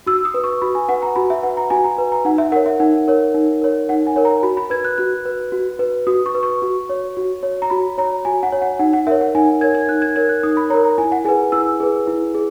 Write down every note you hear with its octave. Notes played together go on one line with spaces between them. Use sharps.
F#4 E6
D#6
B4
C#6
F#4 B5
G#5
B4 F#5
A#5
F#4 B5
E5
B4 F#5
A#5
F#4 G#5
A#5
B4
A#5
D#4 F#5
E5
A#4 C#5 F#5
E5
D#4 F#5
A#4 C#5
D#4
A#4 C#5
D#4 F#5
G#5
A#4 C#5
A#5
F#4 B5
B5
B4 G#6
F#6
F#4 F#6
B4
F#4
B4
F#4 D#6
C#6
B4
C#6
F#4
C#5
F#4
C#5
A#5
F#4 B5
C#5 A#5
F#4 G#5
F#5
C#5
F#5
D#4 F#5
F#5
A#4 C#5 E5
F#5
D#4 G#5
A#4 C#5 G#6
G#6
D#4 F#6
G#6
A#4 C#5 G#6
F#6
D#4 D#6
B5
A#4 C#5 A#5
A#5
E4 G#5
F#5
G#4 B4 G#5
E4 E6
G#4 B4
E4
G#4